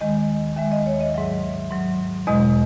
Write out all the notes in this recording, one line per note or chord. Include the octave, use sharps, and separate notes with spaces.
D#2 D#3 G#3 D#5
D#2 D#3 G#3 E5
D#5
C#5
D#5
G#2 F#3 E5
G#2 F#3
E2 B2 G#3 D#5